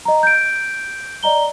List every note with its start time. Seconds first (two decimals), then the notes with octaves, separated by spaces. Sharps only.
0.05 D#5 A#5
0.23 G6 D7
1.23 D5 D#5 A#5 G7